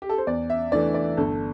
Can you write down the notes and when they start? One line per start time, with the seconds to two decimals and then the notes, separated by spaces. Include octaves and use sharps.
0.02 G4
0.09 A4
0.18 C5
0.27 E2 D5
0.50 E5
0.72 E3 A3 D4 D5
0.94 D5
1.17 G1 A4